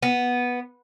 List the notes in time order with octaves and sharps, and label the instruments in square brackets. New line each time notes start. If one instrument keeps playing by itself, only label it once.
[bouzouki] B3